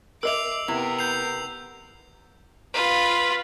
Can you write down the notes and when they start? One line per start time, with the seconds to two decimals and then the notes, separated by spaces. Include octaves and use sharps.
0.23 A#4 D#5 E5 D6 E6 C7 F7
0.68 C3 B3 E4 A#4
0.99 G6 C7 F7
2.74 F4 B4